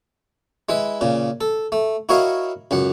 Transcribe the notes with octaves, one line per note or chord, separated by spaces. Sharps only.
G#3 E4 B4
A#2 C#3
A4
A3
E4 F#4 A#4 C#5 D#5 F5
C#2 F#2 F#5